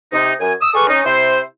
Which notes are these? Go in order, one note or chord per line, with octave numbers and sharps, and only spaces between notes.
C3 D#4
F#2 G#5
D#6 E6
G#4 A4 B4 D5 F5 C#6
C#4 D#4
C3 C4 E4 C5